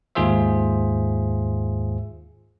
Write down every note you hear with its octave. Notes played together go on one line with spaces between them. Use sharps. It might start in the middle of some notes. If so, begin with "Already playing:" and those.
D#2 G#2 F4 G#4 C5 E5